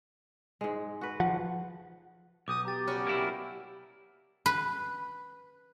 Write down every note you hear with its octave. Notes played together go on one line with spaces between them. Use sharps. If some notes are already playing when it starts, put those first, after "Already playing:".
G#2 G#3
F#4 B4
F3 F#5
B1 D6 D#6 G6
G4 A#5 A6
G3 C#4 F#4 F6
A#3 E4
B4